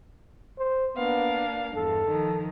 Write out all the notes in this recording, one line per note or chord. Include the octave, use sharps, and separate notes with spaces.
C5
A#3 B3 D4 F5
E2 G2 A4
D#3 F3